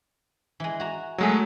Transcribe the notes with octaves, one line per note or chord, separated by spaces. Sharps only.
E3 G#3
F#4 A#5
F#3 G#3 A3 G#4 A#4 C#5